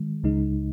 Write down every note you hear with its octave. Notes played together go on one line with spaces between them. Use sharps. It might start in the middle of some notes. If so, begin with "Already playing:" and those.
Already playing: D#3 G#3
C#2 C#3 G#3 D#4